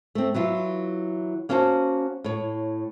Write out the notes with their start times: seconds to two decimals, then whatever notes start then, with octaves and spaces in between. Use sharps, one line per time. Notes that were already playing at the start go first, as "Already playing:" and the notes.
0.15 A3 C4
0.34 E3 F#3 E4 F4
1.49 A#3 C#4 E4 F#4 C5 A5
2.24 A2 C#5